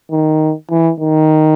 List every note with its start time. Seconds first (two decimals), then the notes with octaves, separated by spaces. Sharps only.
0.11 D#3
0.70 E3
1.00 D#3